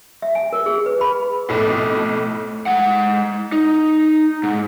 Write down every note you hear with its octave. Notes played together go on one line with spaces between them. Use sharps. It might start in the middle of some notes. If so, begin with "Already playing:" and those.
E5
G#5
A#4
G#4
B4
B5
B1 F2 A2 A3
G#3 F#5
D#4
G#2